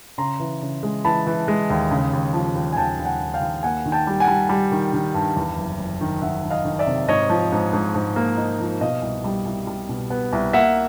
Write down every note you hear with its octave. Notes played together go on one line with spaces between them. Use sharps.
C#3 A#5 C6
E3
C#3
G#3
E3 A5 B5
E3
G#3
D#2
C#3
D#2
F3
D#2
G#5
D#2 G5 A5
D#2
F#5 G#5
D#2
F5 G5
D#2
A#3 F#5 G#5
D#3
G5 A5
G3
F#5 G#5
G3
G3
D#3
D#3
G2
E2
F#1
F#1
D#3
D#3 E5 F#5
D#3
D#5 F5
D#3
D5 E5
C3
G#2 C#5 D#5
F3
G#2
G#2
G#2
A#3
D#4
F3
B2 D#5 F5
C2
G3
C2
G3
B2
B3
C2
A#3 E5 F#5